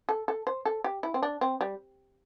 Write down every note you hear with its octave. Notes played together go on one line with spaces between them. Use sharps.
A4
A4
C5
A4
G4
E4
C4
D4
C4
G3